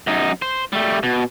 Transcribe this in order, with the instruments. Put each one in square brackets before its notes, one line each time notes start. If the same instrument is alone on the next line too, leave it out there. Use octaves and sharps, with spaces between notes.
[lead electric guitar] F#2 D#4
C5
G3 A3
B2